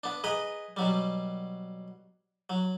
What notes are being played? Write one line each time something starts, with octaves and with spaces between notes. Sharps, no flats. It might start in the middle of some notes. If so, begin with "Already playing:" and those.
B3 D4
G#4 B4 D#5 A#5
B2 F#3 G3
F#3